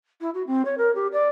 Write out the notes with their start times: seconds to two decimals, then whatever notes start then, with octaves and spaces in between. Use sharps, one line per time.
0.21 E4
0.34 F#4
0.47 C4
0.65 C#5
0.78 A#4
0.95 G4
1.12 D5